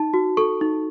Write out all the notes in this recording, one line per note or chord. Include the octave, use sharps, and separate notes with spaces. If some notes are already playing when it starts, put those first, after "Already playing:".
Already playing: D#4 A5
F#4
A4 C#6
D#4